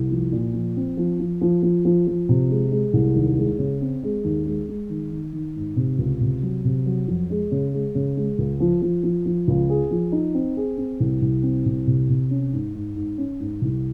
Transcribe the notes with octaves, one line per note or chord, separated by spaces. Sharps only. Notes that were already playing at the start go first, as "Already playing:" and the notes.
Already playing: C2
F3
A#2
F3
C4
F3
F3
F3
F3
F3
F3
C3
G#3
G#3
C2
D#2
G#3
C#3
C4
G#3
D#2
G#3
G#3
D#3
D#3
D#3
G#2
C3
C#2
C3
F#3
C3
F#3
F2
G#3
C#3
G#3
C#3
G#3
C#2
F3
F3
F3
F3
C#2
G#4
F3
D#4
C4
G#4
C4
C2
C2
C4
C2
C3
C3
C#4
G#2
G#2
G#2
C#4
G#2
C2